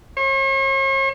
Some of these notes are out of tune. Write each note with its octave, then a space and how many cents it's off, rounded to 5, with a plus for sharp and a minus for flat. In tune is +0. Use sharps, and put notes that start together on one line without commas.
C#5 -45